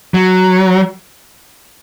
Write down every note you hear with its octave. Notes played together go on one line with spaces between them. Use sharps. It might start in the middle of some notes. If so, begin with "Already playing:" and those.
F#3